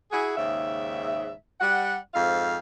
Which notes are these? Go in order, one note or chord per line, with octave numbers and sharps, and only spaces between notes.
E4 F#4 G#4
D#2 G#2 C#3 E5
G3 F#5
F2 G#2 F5